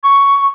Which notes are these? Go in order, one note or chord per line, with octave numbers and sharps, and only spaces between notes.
C#6